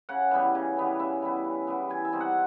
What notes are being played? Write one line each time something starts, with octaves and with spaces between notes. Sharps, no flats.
C#3 F#5
E3 G3 B3
C#3
E3 G3 B3
C#3 E5
E3 G3 B3
C#3
E3 G3 B3
E3 G#5
E5
G3 C4 D#4
F#5